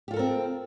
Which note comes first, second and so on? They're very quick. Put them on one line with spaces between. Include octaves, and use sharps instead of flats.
G4 F4 A4 A#4 C4